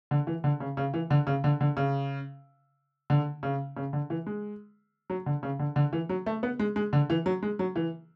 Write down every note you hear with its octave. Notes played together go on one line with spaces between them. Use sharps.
D3
E3
D3
C#3
C#3
E3
D3
C#3
D3
D3
C#3
D3
C#3
C#3
D3
E3
G#3
F#3
D3
C#3
D3
D3
E3
F#3
A3
B3
G#3
G#3
D3
E3
F#3
G#3
F#3
E3